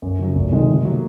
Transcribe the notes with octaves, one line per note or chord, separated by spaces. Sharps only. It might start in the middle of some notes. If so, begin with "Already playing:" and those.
F#2
C#3 F#3
F1
F2 C3 D#3 G#3
C3
F#3 A#3